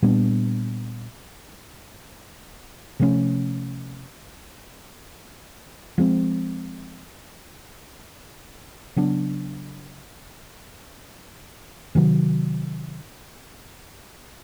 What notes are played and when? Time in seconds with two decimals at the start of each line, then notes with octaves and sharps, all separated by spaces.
0.02 A#2 G3 B3 D4
3.00 C3 F3 A3 C#4
5.98 F3 G#3 C4
8.96 C#3 F#3 B3 D4
11.95 C3 D#3 F#3